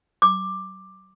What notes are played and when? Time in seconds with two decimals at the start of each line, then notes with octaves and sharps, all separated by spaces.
0.22 D6